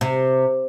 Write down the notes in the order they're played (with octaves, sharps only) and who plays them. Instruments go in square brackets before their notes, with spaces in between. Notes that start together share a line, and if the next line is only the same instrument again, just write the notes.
[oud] C3